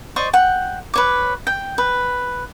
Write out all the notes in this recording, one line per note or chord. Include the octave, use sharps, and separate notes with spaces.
C5 D5 D#5 C#6
F#5 G5
B4 C#5 D6
G5
B4